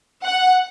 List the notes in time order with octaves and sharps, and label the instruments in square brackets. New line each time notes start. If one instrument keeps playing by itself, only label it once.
[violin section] F#5